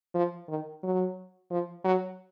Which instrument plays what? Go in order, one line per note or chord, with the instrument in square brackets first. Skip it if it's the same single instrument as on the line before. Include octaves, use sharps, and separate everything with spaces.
[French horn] F3
D#3
F#3
F3
F#3